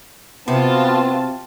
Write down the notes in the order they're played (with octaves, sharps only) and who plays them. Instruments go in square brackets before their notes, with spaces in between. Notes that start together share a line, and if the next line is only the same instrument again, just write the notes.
[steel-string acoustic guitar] C3 [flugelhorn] B3 [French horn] C4 [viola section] F4 F#4 A5